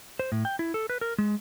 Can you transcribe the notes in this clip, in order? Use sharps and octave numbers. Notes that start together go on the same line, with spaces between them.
C5
A2
G5
E4
A4
B4
A#4
G#3